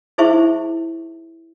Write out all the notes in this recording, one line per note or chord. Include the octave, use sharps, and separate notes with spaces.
D#4 E4 G#4 C5 E5 C#6